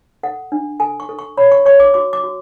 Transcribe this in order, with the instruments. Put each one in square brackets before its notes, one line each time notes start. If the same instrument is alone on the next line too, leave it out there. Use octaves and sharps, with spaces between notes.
[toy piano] A4 F#5
D4
A4 G#5
C#6
A4
C#6
C#5 B5
C#6
C#5 C#6
D6
F#4 D6
D6
F#4